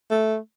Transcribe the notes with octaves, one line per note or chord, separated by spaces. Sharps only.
A3